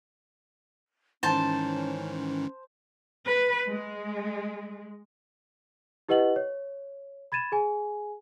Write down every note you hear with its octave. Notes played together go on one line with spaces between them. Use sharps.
G#2 D#3 E3 C#4 C5 A5
B4
G#3
E4 G4 B4 D#5 F#5 F#7
C#5
B5 G#6 A6 D#7 E7
G#4 G#5